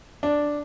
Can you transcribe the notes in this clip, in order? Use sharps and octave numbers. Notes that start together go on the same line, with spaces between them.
D4